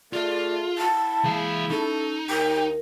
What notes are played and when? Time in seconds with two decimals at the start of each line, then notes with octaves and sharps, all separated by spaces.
0.13 A3 F4 G#4 D5
0.78 E4 F#5 A5
1.24 E3 G#3 A#3 G#4 F5
1.70 C#4 D#4 A4
2.30 D#2 A#4 G5